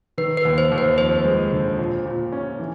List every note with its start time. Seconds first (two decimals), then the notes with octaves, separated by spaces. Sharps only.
0.18 D#3 B4
0.37 B4
0.45 D#2
0.58 C5
0.72 D#2
0.78 B4
0.98 F2 C5
1.24 G#3
1.52 D3
1.79 A#2
2.05 A#2
2.32 C#4
2.59 E3